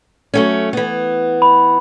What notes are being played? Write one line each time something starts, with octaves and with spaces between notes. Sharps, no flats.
F#3 A3 C#4
E3 B3
B5